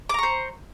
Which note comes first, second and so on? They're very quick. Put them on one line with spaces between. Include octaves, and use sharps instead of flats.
D6 A#5 C#6 C5